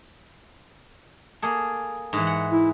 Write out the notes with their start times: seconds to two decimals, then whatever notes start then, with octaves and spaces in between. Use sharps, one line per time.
1.42 A#3 G#4 A4
2.13 G#2 E3
2.27 F#5
2.51 E4